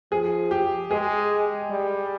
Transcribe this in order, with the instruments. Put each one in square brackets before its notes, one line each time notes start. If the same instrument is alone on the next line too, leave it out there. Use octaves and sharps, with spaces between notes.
[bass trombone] F3 [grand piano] G#4
[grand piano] G4
[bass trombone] G#3 [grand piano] G#4
[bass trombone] G3